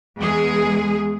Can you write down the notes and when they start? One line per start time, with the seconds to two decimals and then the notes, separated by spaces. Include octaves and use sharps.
0.18 E2 G#3 G#4